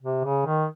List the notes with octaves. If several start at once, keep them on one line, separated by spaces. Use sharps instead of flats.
C3
C#3
D#3